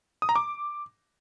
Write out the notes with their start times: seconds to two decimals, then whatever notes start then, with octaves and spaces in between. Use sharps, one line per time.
0.22 D#6
0.29 A#5
0.36 D6